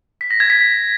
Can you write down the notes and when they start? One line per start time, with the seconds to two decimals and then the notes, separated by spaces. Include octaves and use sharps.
0.21 B6
0.31 A#6
0.40 G#6
0.50 B6